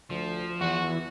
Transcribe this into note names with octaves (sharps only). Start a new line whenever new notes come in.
D2 F3
E2 E3 F#4